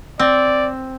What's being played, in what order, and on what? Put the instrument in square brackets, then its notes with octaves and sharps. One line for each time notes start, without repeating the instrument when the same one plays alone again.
[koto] C4 [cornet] D5